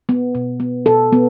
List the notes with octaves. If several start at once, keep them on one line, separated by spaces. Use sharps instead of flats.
B3
B2
B3
B2 A4
B3